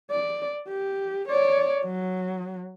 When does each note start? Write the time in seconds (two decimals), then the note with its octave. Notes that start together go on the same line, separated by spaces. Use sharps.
0.11 D5
0.68 G4
1.28 C#5 D5
1.85 F#3